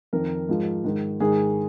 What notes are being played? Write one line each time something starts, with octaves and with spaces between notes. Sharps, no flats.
F2 D#3 A#4
G#2 F3
G#2 D#3
G#2 D#3 G#4